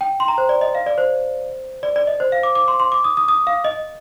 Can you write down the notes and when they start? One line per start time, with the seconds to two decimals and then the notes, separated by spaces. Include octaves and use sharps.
0.01 G5
0.20 C6
0.28 A#5
0.38 C5
0.49 D5
0.61 D#5
0.75 F5
0.86 D5
0.98 C5
1.83 D5
1.96 D5
2.07 D#5
2.20 C5
2.32 F5
2.43 D6
2.55 D6
2.68 C6
2.80 C6
2.92 D6
3.04 D#6
3.17 D#6
3.28 D#6
3.47 F5
3.65 D#5